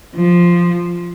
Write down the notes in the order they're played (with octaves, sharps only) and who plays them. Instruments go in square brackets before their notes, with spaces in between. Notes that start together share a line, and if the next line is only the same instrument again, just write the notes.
[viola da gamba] F3